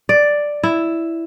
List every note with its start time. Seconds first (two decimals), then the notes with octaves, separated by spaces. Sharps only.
0.09 D5
0.63 E4